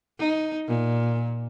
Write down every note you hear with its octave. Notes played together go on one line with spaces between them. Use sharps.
D#4
A#2